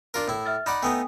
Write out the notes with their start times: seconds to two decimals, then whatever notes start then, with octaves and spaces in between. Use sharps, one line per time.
0.14 D4 F4 A#4
0.28 A2 E4
0.46 E5 F6 A6
0.66 D#4 D5 F#5 B5
0.83 A3 B3 D#4 G5 G#5 D#6